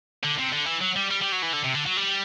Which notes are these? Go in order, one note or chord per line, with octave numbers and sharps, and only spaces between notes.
D3
C3
D3
E3
F#3
G3
G3
G3
F#3
E3
D3
C3
D3
F#3
G3